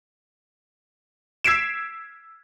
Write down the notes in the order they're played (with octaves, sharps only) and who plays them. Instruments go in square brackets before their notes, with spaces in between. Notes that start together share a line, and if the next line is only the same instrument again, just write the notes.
[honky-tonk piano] E6 G#6 B6 C7 D7 E7